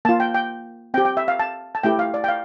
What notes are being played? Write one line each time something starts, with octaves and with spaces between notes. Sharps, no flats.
A#3 F4 A5
G5
G5
C4 G4 G5
G5
E5
F5
A5
A5
A3 E4 G4 G5
F5
D5
G5
F5